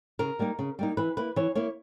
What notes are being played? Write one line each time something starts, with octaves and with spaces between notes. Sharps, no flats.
C#3 A#4
G3 A#3 D#4
C#3
G3 A#3 D#4
E3 B4
A#3 E4 B4
E3 C#5
A#3 E4 C#5